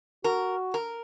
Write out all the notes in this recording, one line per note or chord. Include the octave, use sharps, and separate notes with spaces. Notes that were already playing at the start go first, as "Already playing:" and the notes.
F#4 A#4
A#4